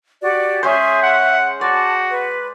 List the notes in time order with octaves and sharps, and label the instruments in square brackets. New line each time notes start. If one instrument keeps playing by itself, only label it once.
[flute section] F#4 G4 D5
[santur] G#3 C#4 C5 [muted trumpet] G#4 [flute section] E5
[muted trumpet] F#5
[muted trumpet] F#4 [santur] D5 [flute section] A5
[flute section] B4